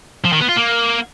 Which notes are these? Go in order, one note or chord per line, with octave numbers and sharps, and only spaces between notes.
F3
D#3
B3
F4
A#3